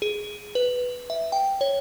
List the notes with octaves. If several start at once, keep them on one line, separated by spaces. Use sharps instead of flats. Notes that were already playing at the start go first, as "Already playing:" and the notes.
G#4
B4
E5
G5
C#5